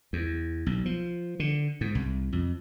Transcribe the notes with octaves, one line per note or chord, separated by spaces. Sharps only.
E2
B1
F3
D3
G#2
C2
F2